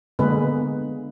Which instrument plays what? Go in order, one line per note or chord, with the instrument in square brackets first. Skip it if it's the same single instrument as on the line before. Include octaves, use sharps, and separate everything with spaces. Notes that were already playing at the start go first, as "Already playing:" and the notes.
[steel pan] D3 G#3 A#3 B3 G#4 B4